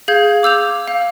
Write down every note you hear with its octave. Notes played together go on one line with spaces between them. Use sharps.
G#4 F5 G6 G#6
D6 E6 G6 F7
F5